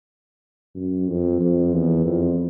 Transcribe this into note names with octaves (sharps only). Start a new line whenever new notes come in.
F#2
F2
F2
E2
F2